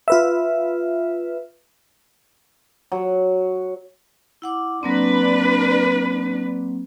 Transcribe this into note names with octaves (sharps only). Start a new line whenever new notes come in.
F4 B4 E5
F#3
E4 F#5 D6
F#3 A#3 C4 D4 B4